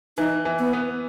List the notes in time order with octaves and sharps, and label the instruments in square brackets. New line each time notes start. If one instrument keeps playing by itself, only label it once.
[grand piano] E3 [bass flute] D#4
[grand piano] E3
[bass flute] B3
[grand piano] B3